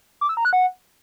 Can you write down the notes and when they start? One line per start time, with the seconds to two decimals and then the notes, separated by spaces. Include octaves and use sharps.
0.21 D6
0.29 E6
0.37 A#5
0.45 F#6
0.53 F#5